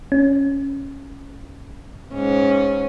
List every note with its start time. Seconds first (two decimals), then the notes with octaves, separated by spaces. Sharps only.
0.12 C#4
2.13 G#2 C#4